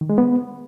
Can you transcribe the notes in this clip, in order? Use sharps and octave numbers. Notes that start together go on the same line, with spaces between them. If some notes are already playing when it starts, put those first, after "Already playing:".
D#3
G#3
B3